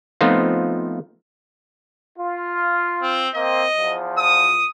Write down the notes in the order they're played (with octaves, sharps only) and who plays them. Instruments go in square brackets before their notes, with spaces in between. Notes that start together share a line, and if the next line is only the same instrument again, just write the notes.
[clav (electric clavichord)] F3 A3 B3 C4 D#4 F4
[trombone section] F4
[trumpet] C4
[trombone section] A#3 C4 [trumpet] D#5
[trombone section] E2 F3
[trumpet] D#6